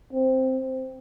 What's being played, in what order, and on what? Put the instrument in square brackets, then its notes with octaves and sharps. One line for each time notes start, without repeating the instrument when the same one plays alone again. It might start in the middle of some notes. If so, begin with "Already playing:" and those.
[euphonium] C4